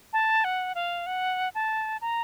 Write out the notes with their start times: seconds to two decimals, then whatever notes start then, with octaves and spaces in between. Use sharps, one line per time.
0.13 A5
0.44 F#5
0.75 F5
1.06 F#5
1.55 A5
2.01 A#5